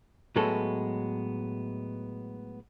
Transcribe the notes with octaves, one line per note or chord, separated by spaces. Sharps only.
A2 F#3 G#3 B3 A4